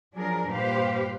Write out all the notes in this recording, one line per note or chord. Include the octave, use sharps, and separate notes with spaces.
F3 F#3 D4 G#4 A#4
G2 A#2 G4 B4 C5 F5